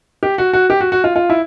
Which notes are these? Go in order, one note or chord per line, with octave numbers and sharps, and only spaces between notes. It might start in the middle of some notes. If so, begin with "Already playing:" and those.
G4
F#4
F#4
G4
F#4
F#4
F4
F4
E4